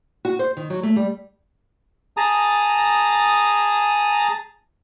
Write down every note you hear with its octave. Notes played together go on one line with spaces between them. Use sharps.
F#4
C5
D#3
F#3
A3
G3
G#4 A5 A#5 D#6